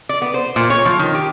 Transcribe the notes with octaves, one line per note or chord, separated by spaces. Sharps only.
D5
B3
C5
A#2
C#5
F3
D#3
G4